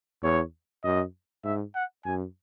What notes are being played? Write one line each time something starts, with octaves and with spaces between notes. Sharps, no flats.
E2 C#5
F#2 D#5
G#2 E5
F#5
F#2 G#5